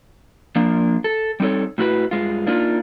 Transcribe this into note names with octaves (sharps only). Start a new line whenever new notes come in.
F3 A#3 D4
A4
G3 C4 D#4 G4 A4 C#5
A2 E4 F#4 B4
G2 G#3 F4
A#3 D4 D#4 F4